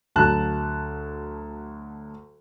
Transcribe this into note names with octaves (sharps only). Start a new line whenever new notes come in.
D2 F#3 A5 F#6